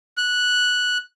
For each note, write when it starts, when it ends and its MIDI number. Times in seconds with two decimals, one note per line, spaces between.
0.17 0.98 90